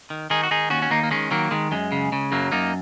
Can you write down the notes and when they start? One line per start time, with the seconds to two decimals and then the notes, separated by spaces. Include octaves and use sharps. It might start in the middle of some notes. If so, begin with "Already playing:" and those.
0.10 D#3
0.30 D#3 D#4 G#4
0.43 F#4
0.51 D#3 D#4 G#4
0.70 D#2 C#4 F#4
0.82 C#4
0.91 D#2 A#3 D#4
1.03 A#3
1.11 D#3 G#3 C#4
1.31 D#3 F#3 A#3
1.51 D#3 G#3
1.72 F#2 G#3
1.92 C#3
2.12 C#3
2.32 F#2 F#3 A#3
2.52 F#2 A#3 D#4